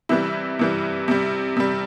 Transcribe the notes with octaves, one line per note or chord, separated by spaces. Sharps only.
C3 E3 G3 E4
C3 E3 G3
C3 G3
C3 G3